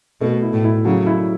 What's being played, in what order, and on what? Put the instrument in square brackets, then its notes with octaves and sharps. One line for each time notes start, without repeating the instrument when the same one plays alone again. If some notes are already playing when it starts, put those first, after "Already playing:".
[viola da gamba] B2 [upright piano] A3
[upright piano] E4
[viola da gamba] A2
[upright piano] E4
[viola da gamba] C#3 [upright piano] F#3
[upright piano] E4